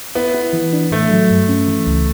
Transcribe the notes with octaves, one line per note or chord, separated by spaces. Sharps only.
B3 E4
E4
E3
D4
A2 A3
F#3
G2
C#4
E3
C#2